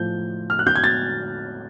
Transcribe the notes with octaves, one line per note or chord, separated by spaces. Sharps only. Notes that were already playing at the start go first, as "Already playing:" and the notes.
Already playing: A2 F3 G6
F6
F#6
G6
G#6
A6